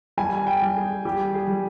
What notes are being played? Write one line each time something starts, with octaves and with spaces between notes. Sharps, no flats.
G3 G#5
G5
G3
G#4
G3 G4
G#4
G3